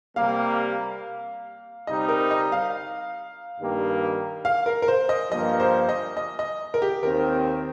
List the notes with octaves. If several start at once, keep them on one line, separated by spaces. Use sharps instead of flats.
C3 G3 A#3 F5
C3 G3 C4 D#4 D#5
A#4
D#5
F5
G2 D#3 G3 A#3
F5
A#4
A#4
C5
D#5
G2 F3 A#3 D#5
C5
D#5
D#5
D#5
A#4
G4
D#2 D#3 C4 A#4